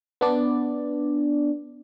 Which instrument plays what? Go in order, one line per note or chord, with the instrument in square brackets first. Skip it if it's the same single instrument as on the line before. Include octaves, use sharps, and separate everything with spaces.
[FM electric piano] B3 D4 D5